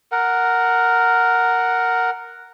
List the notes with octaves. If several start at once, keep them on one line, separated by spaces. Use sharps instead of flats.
A#4 F#5